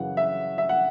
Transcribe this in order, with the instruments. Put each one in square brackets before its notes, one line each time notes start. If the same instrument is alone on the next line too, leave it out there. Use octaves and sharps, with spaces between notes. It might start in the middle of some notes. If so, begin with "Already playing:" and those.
Already playing: [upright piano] F#2 C#3 E3 F#5
E5
E5
F#5